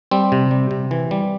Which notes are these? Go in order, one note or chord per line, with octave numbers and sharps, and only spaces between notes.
G3 C4
C3
G3
C3
E3
G3